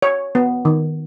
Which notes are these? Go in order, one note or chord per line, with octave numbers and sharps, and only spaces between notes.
C#5
B3
D#3